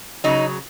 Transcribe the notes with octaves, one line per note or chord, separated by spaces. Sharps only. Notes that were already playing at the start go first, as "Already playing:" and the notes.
C#3 F#3 D#4